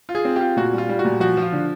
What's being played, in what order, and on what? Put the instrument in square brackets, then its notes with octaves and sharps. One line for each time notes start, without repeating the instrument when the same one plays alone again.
[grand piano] F4
G#4
C4
G4
F4
A#2 F#4
G3
F4
G3
F#4
A#2
F3 F#4
F3
F4
D3